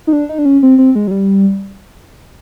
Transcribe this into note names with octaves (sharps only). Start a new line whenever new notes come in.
D#4
D4
D#4
D4
C#4
C4
C4
G#3
F#3
G3